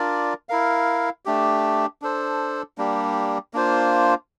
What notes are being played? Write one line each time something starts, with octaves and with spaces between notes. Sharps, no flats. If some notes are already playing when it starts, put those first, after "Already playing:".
Already playing: D4 F4 A#4 D5
E4 A#4 F5
A3 D4 G4
D4 A4 C5
G3 A#3 D4 G4
A#3 D4 F4 C5